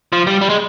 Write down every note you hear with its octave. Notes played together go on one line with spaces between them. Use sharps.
F3
G3
G3
G#3